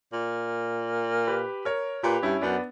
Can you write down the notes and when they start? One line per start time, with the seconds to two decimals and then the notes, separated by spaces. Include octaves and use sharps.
0.13 A#2
1.27 G4 B4
1.65 A#4 C#5
2.03 A#2 G4 B4
2.23 G2 C#4 E4
2.41 F#2 B3 D4